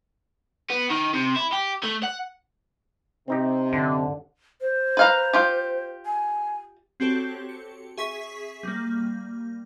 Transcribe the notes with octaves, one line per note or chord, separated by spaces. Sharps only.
B3
D#3
C3
E4
G4
A3
F#5
C3 C4 D#4 G4
F#2 D3
C5
B4 F5 A#5
F4 G4
G#5
C4 F#4 G4 A4 C#5
C#7
G#4 E5 C#6 B6
G3 A#3